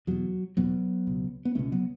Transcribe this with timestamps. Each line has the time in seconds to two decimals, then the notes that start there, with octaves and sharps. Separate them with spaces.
0.07 E2 B2 F#3
0.57 E2 B2 F#3 B3
1.07 C#2 B2
1.45 B3
1.55 C#2 B2 A3 C#4
1.72 F#3 B3